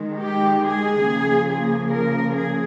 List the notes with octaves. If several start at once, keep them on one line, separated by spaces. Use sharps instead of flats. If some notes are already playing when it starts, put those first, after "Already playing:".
Already playing: D#3 G#3
G4
G#4
C#3 F3 A#3
G#4
A#4
G#4